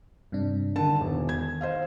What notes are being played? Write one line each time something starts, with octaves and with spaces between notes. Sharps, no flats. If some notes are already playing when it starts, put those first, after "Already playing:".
G2 C3 D4
D3 D#3 A5
E1
G#6
C5 D#5 F5